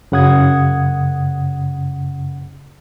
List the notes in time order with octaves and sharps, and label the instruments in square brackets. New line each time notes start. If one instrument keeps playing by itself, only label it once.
[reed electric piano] F#2 C#3 F#5 D#6 G#6